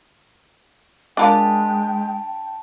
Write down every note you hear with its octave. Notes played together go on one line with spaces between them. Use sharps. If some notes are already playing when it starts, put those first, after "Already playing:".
G#3 D4 F4 A#4 G5 A5 B5